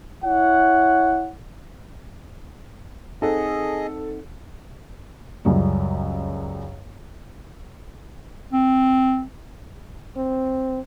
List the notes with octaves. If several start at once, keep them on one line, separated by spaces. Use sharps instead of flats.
E4 C#5 F#5
C4 D#4 G#4 A4 D#5 F#5
C#2 F#2 G3
C4
C4